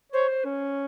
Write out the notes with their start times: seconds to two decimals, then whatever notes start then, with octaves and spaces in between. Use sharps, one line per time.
0.12 C5 C#5
0.28 C5
0.45 C#4